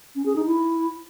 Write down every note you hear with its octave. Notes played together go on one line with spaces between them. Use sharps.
C#4
G#4
D#4
E4